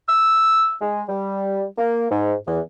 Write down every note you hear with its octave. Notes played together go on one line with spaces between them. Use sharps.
E6
G#3
G3
A#3
G#2
E2